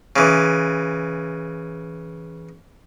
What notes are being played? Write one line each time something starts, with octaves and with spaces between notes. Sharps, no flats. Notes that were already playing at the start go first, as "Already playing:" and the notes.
C#3 E3